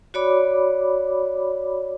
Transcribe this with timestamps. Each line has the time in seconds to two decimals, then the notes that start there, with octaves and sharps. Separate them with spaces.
0.14 F#4 C#5 D5 B5 D6